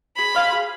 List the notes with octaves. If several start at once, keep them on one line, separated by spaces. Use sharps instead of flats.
G#4 B5
C5 F5 G#5
G#4